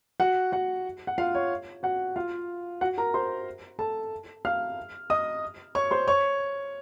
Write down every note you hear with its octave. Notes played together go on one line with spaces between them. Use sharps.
F#4 F#5
F#4 F#5
F#5
F4 F5
C#5
F#4 F#5
F4 F5
F#4 F#5
A#4 A#5
C5 C6
A4 A5
F5 F6
D#5 D#6
C#5 C#6
C5 C6
C#5 C#6